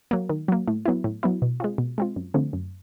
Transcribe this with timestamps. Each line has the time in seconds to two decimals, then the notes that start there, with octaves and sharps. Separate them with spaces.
0.11 F#3 A#3
0.29 D#3
0.48 F#3 A#3
0.68 A2
0.85 F#3 B3 E4
1.04 A2
1.23 F#3 B3 E4
1.42 B2
1.60 G#3 C4 F4
1.78 B2
1.98 G#3 C4 F4
2.16 F#2
2.34 D3 F3 A3 C4
2.53 F#2